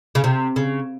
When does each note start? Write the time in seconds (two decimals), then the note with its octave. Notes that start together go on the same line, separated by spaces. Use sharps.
0.15 C#3
0.24 C3
0.56 C#3